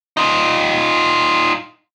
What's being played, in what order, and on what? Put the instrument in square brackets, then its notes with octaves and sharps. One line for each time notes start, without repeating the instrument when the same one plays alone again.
[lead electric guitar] D#4 F4